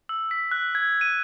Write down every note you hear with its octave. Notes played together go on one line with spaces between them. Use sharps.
E6
B6
F#6
G#6
D#7